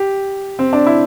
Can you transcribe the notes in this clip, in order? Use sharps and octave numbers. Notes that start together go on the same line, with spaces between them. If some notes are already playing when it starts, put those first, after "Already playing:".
Already playing: G4
C4
D4
E4